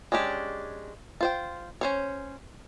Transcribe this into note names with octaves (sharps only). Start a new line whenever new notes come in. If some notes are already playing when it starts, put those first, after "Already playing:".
G#3 C#4 D4 G4
F4 C5 G5
C#4 C5 C#5